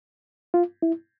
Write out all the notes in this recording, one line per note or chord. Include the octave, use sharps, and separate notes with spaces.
F4
E4